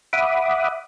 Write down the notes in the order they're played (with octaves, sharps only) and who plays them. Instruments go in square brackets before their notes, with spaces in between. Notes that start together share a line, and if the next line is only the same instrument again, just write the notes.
[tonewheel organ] E5 F#5 B5 D6 D#6